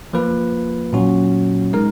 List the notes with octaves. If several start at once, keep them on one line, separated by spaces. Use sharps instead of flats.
F3 A#3 F4 B4
A#2 F#3 C#4 F#4
G#3 D#4 A#4